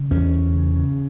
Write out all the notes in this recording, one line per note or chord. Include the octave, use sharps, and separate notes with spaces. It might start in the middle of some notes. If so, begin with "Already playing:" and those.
Already playing: C#3
E2 C#4
E2
C#3
C#3